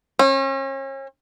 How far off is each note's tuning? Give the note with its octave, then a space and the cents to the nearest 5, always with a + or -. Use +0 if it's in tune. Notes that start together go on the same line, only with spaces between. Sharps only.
C#4 -40